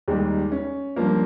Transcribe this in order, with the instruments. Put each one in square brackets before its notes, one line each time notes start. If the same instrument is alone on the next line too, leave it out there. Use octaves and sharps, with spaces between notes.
[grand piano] D#2 D#3 G3 [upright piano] G#3
[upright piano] C#4
[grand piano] G2 F3 A#3